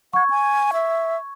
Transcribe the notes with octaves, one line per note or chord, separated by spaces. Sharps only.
F#5 C#6 G#6
G#5
E5